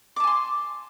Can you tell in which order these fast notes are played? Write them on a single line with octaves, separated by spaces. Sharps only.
D6 A5 G#5 C6